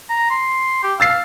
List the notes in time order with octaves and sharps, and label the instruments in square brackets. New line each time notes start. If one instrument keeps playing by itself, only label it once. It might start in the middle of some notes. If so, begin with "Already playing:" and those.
[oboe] A#5
C6
G4
[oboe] F5 [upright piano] E6 A6 C7